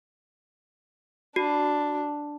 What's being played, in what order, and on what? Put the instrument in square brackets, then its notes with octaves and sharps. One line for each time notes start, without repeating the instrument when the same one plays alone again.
[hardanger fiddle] D4 [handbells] F#4